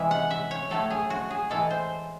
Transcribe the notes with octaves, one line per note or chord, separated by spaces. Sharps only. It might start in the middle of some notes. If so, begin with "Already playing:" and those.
Already playing: C3 E3 G#3 E5
F#5
E5
C#5
A2 F#3 A3 A4
G#4
F#4
G#4
A2 E3 G#3 A4
C5